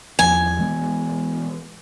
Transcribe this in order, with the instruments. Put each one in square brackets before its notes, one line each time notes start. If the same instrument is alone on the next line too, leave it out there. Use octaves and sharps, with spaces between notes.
[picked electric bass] E2 F3 [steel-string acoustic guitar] G#5
[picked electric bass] E3 G#3 B3